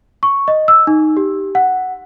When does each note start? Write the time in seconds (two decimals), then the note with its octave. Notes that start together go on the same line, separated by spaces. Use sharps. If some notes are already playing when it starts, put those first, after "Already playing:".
0.23 C#6
0.48 D#5
0.68 E6
0.87 D#4
1.17 G4
1.55 F#5